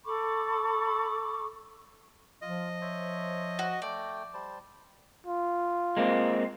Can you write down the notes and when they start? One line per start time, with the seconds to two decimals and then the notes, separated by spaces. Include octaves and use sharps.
0.04 A4 B5 C#6 D6
2.42 F3 F4 D#5
2.81 C5 C#5 E5
3.59 F#4
3.82 A3 D5 G5
4.34 G3 C5 A5
5.27 F4
5.97 G#3 A#3 C4